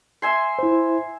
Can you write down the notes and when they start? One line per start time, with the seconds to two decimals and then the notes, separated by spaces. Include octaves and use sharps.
0.22 E5 G#5 C6
0.59 E4 C5